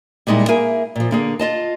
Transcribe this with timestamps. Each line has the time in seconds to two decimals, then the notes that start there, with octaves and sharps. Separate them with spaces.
0.27 A#2 G3 G#3 D#4 E4
0.48 A#3 E4 G#4 A#4 E5 G#5
0.96 A#2 F3
1.11 D3 A#3 G#4
1.39 F4 D#5 A5